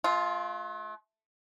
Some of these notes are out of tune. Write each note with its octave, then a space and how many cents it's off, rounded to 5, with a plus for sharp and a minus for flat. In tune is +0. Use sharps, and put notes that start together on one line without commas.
A3 -45 F4 +5